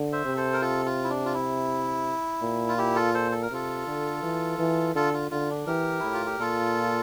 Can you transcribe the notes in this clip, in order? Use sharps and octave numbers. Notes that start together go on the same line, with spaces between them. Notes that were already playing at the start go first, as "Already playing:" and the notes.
Already playing: D3
C5 E5
C3
A4 C5
A#4
F4 A4
F4
E4
D4
F4
E4
A#2
F4
E4 G4
F4 A4
A4 C5
A4
A#4
C3 F4 A4
D3
E3
E3
D3 F4 A4
F4
D3 F4
D4
E3 G4 A#4
A2 E4
F4
G4
A#2 F4 A4